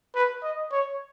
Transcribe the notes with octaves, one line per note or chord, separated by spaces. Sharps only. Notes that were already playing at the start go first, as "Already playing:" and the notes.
B4
D#5
C#5